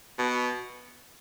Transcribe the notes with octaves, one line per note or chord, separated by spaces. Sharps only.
B2